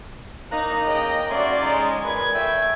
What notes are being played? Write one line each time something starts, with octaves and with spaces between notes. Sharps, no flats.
A#3 D#4 A#5 F#6
C#3 D#5 G5
A3 C#4 F#4 D5 G#5 C6
G#3 D#4
A#2 B4 G#6
A3 E5 G5 G#5